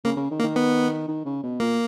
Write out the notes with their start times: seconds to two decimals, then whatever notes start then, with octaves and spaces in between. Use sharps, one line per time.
0.05 C#3 A#3
0.17 C#3
0.31 D#3
0.40 A#3
0.43 D#3
0.56 B3
1.08 D#3
1.25 C#3
1.43 B2
1.60 A#2 A#3